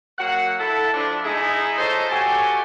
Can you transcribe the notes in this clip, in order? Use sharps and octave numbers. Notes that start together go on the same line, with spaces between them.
F#3 A#3 F#4 F#5
E4 A4
F3 D4
G#3 D#4 E4 G#4
D#4 F4 A4 C5 C#5 D#5
A3 F#4 G4 A4 G#5